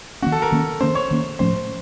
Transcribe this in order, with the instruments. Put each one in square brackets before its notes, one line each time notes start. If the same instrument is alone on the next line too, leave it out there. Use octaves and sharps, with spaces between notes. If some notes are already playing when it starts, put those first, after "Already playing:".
[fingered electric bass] D#3 A#3 C#4 [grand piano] F#4
[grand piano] A4
A#4
[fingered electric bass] D#3 A#3 C#4
[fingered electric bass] D#3 A#3 C#4 [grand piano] C5
[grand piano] C#5
[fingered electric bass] D#3 A#3 C#4
[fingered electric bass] A2 F3 A3 C#4 [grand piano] C5